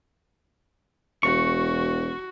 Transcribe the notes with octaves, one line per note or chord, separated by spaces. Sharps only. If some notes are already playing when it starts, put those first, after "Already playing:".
E1 F#4 C#6